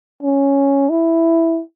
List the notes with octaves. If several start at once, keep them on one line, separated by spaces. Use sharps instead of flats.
C#4
E4